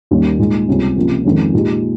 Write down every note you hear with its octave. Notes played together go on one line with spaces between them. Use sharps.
D#2 D#3 G3 C#4
A#2 G#3 D#4
C#2 C3 G3 C#4
C#2 C3 F3 A#3
F2 D#3 G#3 C#4
A#2 G#3 D#4 G4